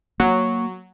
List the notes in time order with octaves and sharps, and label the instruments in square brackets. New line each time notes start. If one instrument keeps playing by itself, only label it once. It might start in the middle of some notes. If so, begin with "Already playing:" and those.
[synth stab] F#3 [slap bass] A#3 [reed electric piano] C#6